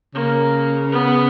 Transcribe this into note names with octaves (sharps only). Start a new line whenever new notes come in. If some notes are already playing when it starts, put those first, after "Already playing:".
C#3 A#3
B3